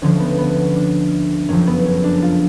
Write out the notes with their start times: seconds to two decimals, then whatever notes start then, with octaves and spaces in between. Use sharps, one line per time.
0.02 D2 D3 F3 C#4
0.20 B3
0.38 B3
0.56 C#4
0.76 D4
1.48 F#1 F2 F3 C#4
1.67 B3
1.86 C#4
2.04 D4
2.22 F4